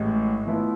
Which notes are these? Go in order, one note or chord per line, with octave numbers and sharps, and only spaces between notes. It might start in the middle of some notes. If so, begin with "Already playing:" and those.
Already playing: A1 A2 G#3
A2 F3 B3 E4